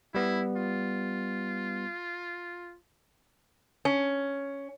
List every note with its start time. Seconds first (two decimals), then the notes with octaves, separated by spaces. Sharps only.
0.15 G3 B3 E4
0.57 F4
3.85 C#4